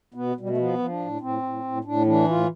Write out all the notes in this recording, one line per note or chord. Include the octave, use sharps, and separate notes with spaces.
B2 B3
B2 G3
A3
F3 B3
F3
D4
A2
A2 C4
A2
A2
A2 D4
E3 D4
A2 F4